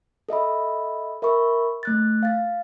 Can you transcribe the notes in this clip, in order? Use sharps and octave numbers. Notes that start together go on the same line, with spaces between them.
A4 D#5 E5 B5
A#4 E5 B5 C#6
A3 F#6 A6
F5 A6